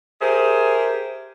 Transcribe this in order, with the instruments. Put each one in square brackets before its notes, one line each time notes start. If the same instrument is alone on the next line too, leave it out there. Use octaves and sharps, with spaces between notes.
[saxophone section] G4 G#4 A#4 C5 E5